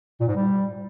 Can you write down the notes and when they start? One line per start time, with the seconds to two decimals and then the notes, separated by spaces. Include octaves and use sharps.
0.20 A#2
0.28 G#2
0.35 G3